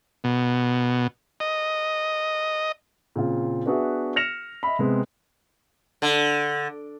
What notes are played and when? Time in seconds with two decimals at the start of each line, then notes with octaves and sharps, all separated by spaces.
0.24 B2
1.40 D#5
3.16 A#2 C#3 C4 F4
3.66 B3 D4 F#4 G#4 B4 E5
4.16 F6 A#6 C#7 E7 F7
4.63 D#5 E5 B5
4.79 C3 G#3 B3 C4
6.02 D3